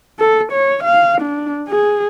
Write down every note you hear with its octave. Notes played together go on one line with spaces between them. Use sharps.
A4
C#5
F5
D4
G#4